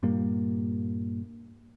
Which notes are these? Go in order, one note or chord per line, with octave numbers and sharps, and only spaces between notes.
G2 A#2 G3 A#3